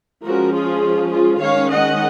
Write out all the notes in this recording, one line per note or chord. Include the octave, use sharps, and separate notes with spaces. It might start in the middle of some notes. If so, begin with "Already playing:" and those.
F3 G#3 C#4 F#4 A#4
F4 G#4
F4 G#4
D#3 G#3 C#4 C#5 F5
D#5 F#5